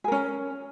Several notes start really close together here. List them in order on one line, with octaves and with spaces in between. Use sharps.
G#4 A#4 C#4